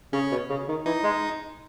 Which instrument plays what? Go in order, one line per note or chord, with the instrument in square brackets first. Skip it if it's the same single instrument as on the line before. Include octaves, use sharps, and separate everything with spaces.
[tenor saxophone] C#3 [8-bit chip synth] C#4
[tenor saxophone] B2
C#3
D#3
[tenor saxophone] E3 [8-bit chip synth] D#4
[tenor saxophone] G#3